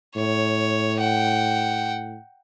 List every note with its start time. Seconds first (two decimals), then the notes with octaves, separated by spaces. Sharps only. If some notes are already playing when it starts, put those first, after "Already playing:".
0.16 A2 C#5
0.98 F#5 G5